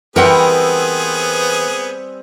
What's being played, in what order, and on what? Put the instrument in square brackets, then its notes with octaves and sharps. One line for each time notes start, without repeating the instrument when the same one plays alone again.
[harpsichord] E3 [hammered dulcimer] G3 C4 [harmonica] B3 G#4 [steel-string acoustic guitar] A#4 F#5 G5